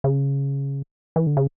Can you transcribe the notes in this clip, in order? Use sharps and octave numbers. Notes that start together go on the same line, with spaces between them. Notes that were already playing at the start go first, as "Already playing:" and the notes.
C#3
E3
D3
C#3